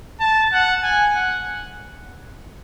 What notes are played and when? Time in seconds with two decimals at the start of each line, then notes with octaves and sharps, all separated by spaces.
0.20 A5
0.53 F#5
0.83 G#5
1.15 F#5